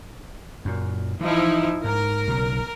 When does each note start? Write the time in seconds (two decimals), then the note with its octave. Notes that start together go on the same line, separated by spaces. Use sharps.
0.65 F#2 A#2
1.21 E3 F3 D#4 E4
1.84 G#2 A#4
2.27 B1 C#3